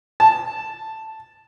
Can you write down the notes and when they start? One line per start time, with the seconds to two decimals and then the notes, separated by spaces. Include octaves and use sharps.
0.20 A5